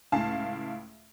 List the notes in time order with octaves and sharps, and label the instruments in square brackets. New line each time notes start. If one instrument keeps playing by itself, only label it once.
[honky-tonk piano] C#2 A2 F5 A5